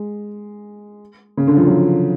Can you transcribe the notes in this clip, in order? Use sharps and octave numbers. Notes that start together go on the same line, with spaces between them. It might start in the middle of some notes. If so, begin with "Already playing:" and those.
Already playing: G#3
C#3
D3
F3
F#3